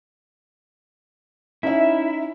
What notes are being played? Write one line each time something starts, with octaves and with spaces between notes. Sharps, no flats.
C#4 D#4 E4 E5